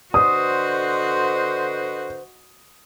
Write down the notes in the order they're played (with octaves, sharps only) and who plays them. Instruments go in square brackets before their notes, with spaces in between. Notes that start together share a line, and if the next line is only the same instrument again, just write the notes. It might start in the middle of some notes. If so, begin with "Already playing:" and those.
[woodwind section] D3 B4 C5 [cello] F#4 D#5 [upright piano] D#6